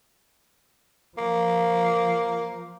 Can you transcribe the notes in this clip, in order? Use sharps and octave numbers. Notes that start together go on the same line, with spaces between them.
F3 A#3